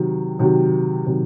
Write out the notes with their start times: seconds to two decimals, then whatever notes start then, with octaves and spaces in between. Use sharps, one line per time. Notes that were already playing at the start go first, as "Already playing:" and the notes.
Already playing: C3 D#3 F#3
0.39 C3 D#3 F#3
1.06 C3 D#3 F#3